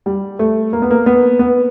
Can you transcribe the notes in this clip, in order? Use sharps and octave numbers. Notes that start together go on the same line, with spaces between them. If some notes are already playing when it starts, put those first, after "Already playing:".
G3
A3
A#3
B3
A#3
B3
B3